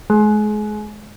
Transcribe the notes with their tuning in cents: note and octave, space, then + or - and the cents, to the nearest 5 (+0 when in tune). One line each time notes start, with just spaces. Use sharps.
G#3 +30